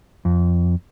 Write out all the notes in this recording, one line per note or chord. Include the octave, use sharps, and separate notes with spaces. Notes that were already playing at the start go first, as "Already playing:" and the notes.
F2